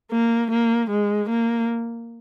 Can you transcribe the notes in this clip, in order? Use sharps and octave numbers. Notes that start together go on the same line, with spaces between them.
A#3
A#3
G#3
A#3